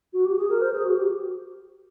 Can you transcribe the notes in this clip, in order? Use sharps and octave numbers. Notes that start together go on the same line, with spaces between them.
F#4
G4
G#4
A#4
C5
G#4
F#4
G4